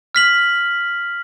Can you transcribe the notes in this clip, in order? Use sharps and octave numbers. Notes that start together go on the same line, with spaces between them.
F6 B6 F#7